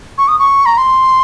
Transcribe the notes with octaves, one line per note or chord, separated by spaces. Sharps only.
C#6
D#6
C#6
A#5
C6